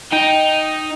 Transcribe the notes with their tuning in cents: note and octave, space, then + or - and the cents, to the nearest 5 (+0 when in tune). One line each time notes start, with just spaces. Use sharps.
D#4 +0 G5 +0